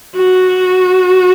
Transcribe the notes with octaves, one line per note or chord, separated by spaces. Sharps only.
F#4